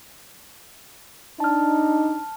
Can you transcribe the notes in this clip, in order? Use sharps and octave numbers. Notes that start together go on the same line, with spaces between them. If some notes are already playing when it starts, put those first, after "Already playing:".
D4 D#4 A5 F6